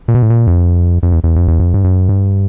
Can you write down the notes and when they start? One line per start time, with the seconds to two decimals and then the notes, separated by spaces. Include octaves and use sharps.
0.08 A#2
0.15 B2
0.23 A2
0.30 A#2
0.47 F2
1.03 F2
1.12 E2
1.24 E2
1.36 F2
1.48 E2
1.60 F2
1.74 G2
1.84 F#2
2.09 G2